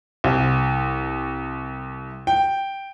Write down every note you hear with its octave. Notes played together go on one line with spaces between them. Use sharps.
C2
G5